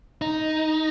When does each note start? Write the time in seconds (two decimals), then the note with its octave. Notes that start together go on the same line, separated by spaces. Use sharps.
0.22 D#4